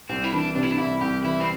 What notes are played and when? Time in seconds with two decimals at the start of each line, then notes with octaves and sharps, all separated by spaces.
0.09 C2 C4
0.24 E4
0.33 E3 D4
0.55 C3 D4
0.63 E4
0.71 D4
0.78 C2 E4
1.01 C2 G4
1.24 E3 E4
1.40 C4